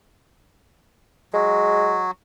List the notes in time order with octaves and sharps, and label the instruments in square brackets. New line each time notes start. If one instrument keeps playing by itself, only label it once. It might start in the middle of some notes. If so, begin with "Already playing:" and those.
[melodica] F#3 [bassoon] G#3